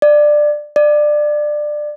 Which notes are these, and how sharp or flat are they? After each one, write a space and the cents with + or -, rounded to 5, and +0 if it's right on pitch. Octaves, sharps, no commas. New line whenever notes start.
D5 +15
D5 +20